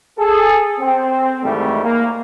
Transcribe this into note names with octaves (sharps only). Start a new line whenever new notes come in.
G#4 A4
C4
G#2 D#3 E3 G3 A3
A#3